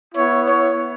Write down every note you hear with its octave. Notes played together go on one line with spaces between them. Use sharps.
B3 E4 C#5
C#5